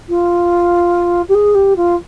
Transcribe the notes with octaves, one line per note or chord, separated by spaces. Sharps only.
F4
G4
G#4
G4
F4